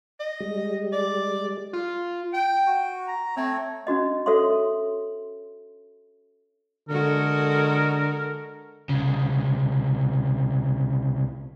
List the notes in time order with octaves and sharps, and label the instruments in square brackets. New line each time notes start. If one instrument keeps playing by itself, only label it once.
[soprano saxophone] D#5
[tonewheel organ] G3 G#3
[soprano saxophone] D5
[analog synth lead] F4
[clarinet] G5
[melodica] F#4
[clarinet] A#5
[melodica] A3 C#5 [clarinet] C4
[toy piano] C#4 D4 F#4 D#5
F#4 A4 C#5 E5 C6
[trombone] D3 [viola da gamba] G#3 F#4 A4 [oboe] A#4
[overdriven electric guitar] C2 C#3